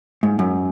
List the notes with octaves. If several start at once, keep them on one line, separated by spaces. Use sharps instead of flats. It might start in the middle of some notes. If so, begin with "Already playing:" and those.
G#2
F#2